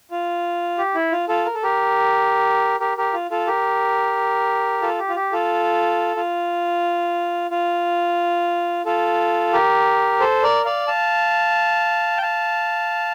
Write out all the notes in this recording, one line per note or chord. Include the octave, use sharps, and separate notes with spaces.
F4
G4
E4
F4
F4 A4
A#4
A4
G4 A#4
G4 A#4
G4 A#4
F4
F4 A4
G4 A#4
F4 A4
G4
F4
G4
F4 A4
F4
F4
F4 A4
G4 A#4
A4 C5
A#4 D5
D5 F5
F5 A5
G5
F5 A5